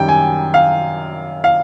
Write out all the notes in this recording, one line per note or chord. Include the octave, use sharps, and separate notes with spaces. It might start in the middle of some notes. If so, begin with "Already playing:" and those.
Already playing: F#2 D#3 G3 G5
G#5
F5
F5